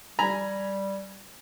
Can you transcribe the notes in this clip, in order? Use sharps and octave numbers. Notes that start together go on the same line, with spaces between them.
G3 G#5 A#5 B5